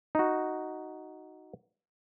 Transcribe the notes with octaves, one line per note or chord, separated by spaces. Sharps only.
D#4 F#4